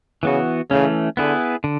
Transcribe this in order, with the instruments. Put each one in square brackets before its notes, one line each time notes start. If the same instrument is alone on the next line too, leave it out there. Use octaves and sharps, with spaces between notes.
[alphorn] C#3 [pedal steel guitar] E3 B3 F#4
[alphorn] C#3 [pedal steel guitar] E3 A3 C#4
[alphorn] D3 [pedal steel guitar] B3 E4 G#4 B4
[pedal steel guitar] D3